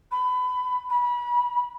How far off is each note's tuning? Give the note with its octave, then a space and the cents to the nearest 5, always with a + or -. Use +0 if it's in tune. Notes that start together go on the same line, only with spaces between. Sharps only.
B5 +25
B5 -25